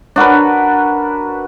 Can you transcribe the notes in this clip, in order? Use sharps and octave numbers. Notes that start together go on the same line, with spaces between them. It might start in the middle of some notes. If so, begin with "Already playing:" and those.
D4 F#4 A#4 B4